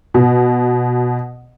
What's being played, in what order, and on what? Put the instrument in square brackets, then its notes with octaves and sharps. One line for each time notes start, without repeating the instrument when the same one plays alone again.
[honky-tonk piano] B2